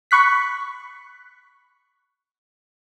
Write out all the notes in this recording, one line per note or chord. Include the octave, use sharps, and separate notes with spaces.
B5 C#6 F#6 B6